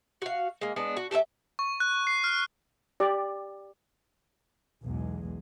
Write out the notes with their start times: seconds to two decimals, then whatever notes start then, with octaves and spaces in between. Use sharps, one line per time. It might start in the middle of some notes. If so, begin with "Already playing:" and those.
0.22 F#4 F5
0.61 G#3 A#3
0.76 G#3 B3 D4
0.97 F#4
1.11 G4 A4 C#5 E5
1.59 C#6
1.80 F#6
2.07 C7
2.24 F6
3.00 G4 D5
4.82 B1 E2 G#3